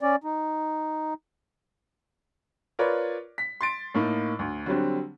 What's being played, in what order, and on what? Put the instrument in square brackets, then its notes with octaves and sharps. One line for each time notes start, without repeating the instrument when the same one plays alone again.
[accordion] C#4 D5
D#4
[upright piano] F4 A#4 B4 C#5 D5
B6
C6 A6 D7
A2 A#3 D#4
D2
D3 F#3 G3 C4